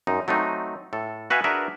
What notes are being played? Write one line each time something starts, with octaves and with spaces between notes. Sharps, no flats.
F#2 D#4
F#3 A3 C4 D#4
A2 A4
F#4 B4 E5 F5 G#5
D4 F#4 G#4 A#4 B4 E5